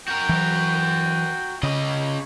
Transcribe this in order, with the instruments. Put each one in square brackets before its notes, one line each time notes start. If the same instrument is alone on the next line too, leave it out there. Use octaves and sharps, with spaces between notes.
[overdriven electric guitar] F#4 A#4 [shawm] G5
[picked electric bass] E3 F#3
[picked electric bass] C#3 [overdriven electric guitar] C#4 D#5